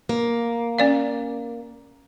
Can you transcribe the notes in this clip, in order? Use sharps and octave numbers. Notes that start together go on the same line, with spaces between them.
A#3
C#4 D5 F5